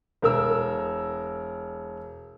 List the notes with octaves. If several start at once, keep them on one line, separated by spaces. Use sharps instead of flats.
E1 A#4 E6